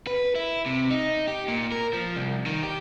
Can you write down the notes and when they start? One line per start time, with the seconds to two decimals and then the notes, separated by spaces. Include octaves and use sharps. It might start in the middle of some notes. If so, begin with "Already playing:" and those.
0.07 B4
0.35 E4
0.66 C3
0.90 D#4
1.27 G4
1.48 A#2
1.72 A#4
1.93 F3
2.16 C2
2.46 D#3
2.63 G4